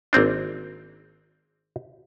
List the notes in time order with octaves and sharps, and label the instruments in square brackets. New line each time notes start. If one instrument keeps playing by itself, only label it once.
[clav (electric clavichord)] G#1 A#3 C4 D4